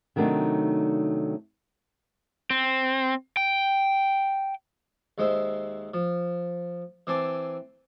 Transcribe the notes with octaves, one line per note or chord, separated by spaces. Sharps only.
C3 D#3 F#3 A3 D4 D#4
C4
G5
D#2 G#3 C5 E5
F3
E3 C4 C5 G#5 A5 D6